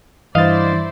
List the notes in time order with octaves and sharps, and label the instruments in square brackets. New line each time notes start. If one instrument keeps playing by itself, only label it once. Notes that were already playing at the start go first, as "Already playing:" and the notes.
[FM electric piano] G2 [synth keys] E3 A6 [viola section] E4 C5 D5 [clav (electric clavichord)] D#5 F5